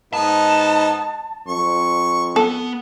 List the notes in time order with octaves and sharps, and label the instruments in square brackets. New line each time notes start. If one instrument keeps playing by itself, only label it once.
[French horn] G#2 [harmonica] B3 D#4 [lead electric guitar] A5
[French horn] F2 [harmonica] C#6
[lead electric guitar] B3 [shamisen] A4